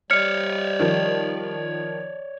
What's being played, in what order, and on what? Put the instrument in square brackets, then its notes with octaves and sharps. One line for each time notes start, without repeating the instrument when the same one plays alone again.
[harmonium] G3 [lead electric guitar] C#5 D5 [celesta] F6 C#7
[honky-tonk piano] D#3 F3